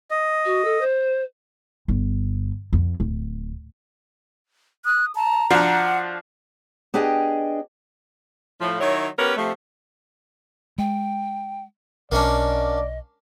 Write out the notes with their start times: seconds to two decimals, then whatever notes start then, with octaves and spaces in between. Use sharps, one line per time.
0.11 D#5
0.44 F#4
0.64 A4
0.80 C5
1.88 G1
2.73 F2
3.00 D1
4.85 D#6 F#6
5.15 A5 A#5
5.50 F3 D4 F#4 F#5
6.94 B3 D4 G4 G#4 D#5 G5
8.59 A2 F3
8.80 D#3 F#3 E4 C#5
9.18 B3 C#4 G4 A#4 B4
9.36 C3 F3 A3
10.78 G#3 G5
12.12 B1 A#3 C#4 D4 D5 D#5